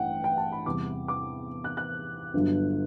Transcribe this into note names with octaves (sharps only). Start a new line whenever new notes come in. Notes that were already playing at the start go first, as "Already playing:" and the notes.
Already playing: A1 G2 F#5 G5
G5
A5
B5
E2 C3 G3 D6
D6
F#6
F#6
G1 G2 D3 F#3